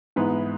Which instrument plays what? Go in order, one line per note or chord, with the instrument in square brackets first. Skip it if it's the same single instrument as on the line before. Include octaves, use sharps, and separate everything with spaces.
[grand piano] G#2 E3 B3 B4